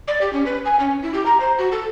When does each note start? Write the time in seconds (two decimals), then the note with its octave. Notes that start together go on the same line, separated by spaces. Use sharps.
0.08 D5
0.21 G4
0.33 C#4
0.46 B4
0.65 G#5
0.80 C#4
1.03 E4
1.14 G4
1.26 A#5
1.40 C5
1.58 F#4
1.72 A4